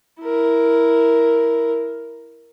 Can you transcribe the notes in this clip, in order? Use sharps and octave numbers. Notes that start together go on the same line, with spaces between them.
E4 A#4